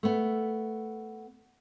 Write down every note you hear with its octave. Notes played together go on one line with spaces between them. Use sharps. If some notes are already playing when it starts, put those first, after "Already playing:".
A3 B3